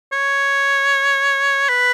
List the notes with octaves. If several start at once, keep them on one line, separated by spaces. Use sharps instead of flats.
C#5
B4